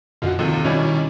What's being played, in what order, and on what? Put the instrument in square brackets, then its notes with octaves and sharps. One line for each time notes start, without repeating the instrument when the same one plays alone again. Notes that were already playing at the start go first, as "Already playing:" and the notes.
[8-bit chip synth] F#2 B2 D3 [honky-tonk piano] F4 F#4
[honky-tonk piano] D#2 C3 [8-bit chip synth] F4 A4
[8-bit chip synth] B2 D#3 G3 [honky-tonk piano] C#4 E4 D5